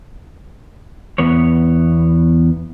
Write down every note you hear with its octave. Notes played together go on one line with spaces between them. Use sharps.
E2 B3 C#5